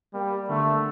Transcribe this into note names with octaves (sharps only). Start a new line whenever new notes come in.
G3 A#3
D3 A3